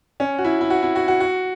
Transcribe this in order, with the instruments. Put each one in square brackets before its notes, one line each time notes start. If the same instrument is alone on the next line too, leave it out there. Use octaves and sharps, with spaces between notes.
[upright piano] C#4
F#4
E4
E4
F#4
E4
F#4
F#4
F#4